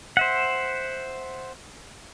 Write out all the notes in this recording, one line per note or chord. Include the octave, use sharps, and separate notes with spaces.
C5 E5 F#5